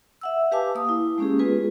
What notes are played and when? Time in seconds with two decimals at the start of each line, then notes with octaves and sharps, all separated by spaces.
0.21 E5 F#5 E6
0.52 G4 B4 F5 G#5 A5 D6
0.75 A#3 D#6
0.89 E4
1.18 G#3 A#3 C#4 G4 G#4
1.39 G#3 B3 F4 G#4 B4